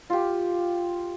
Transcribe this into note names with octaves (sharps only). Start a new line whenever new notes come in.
F4 G4